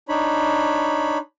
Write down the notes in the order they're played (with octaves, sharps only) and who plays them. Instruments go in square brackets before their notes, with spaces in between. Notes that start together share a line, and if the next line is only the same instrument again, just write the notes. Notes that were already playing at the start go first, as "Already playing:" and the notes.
[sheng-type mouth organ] D4 D#4 C#5 B5